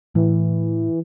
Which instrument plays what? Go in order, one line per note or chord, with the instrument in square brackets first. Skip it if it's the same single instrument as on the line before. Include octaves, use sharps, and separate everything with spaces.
[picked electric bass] A2 [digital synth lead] E3